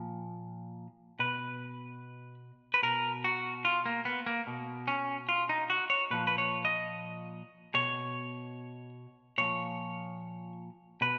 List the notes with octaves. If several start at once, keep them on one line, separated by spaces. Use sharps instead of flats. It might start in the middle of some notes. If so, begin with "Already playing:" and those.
Already playing: A#2 F3
B2 B4
B4
B2 A#4
F#4
F4
A#3
B3
A#3
B2
C#4
F4
D#4
F#4
C#5
A#2 F3 B4
B4
C#5
D#5
B2 C#5
A#2 F3 C#5
B2 B4